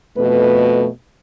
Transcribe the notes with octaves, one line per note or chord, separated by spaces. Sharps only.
F2 B2 A3 B4